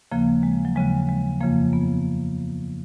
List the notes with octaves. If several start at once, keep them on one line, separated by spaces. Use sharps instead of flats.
D#2 C#3 F3 A#3
G#3
F#3
D#2 C#3 F3 G#3
G#3
F2 C#3 F3 A#3
B3